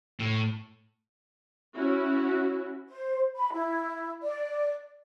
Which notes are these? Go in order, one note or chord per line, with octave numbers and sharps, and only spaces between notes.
A2
C#4 E4 F#4
C5
B5
E4
D5